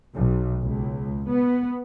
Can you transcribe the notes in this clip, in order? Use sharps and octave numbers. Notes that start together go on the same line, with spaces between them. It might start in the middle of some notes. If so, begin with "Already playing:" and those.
B1
C#2
B3